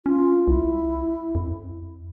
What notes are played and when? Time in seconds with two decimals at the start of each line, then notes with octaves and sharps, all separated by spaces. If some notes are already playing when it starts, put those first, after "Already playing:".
0.06 C#4 F4
0.48 C2 E4
1.35 F2